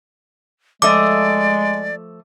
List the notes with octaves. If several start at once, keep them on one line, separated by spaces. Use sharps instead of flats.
F3 G#3 A3 D5 D#5 D6